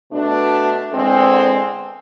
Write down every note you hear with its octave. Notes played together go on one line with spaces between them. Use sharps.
B2 A3 D4
E2 D3 G#3 C4